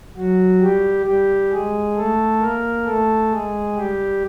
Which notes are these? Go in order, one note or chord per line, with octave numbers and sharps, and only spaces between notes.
F#3 F#4
G3 G4
G3 G4
G#3 G#4
A3 A4
A#3 A#4
A3 A4
G#3 G#4
G3 G4